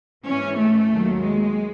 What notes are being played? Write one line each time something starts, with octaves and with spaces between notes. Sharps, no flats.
G#2 E3 C#4
A3
D#2 D#3 F#3
G#3